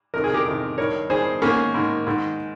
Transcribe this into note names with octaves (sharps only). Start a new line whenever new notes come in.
F2 C3 D#3 A#4
G#4
G4 A#4
F2 C3 D#3
G2 D#3 A#4 C#5
G2 D#3 G#4 C5
G#2 D#3 A#3 C#4
G#2 D#3
G#2 D#3